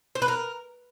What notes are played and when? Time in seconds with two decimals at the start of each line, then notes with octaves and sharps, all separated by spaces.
0.15 C5
0.22 B4
0.28 A#4